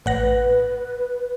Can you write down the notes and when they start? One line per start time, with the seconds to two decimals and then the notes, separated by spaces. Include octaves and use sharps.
0.06 A1 B4 F#5 A#6